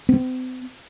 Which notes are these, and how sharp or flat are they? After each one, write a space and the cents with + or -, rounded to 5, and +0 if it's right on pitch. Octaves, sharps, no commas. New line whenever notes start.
C4 -40